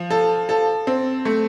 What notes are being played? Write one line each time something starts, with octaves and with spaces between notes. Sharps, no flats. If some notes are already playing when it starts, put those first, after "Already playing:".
Already playing: F3
A4
A4
C4
A3